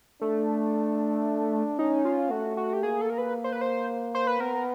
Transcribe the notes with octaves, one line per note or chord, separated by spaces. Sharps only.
A3 D4
C#4 D#4
F4
A3 F#4
F#4
G4
A#3 G#4
A4
A#4
B4
C5
B4
C5
C5
B4
B3 A#4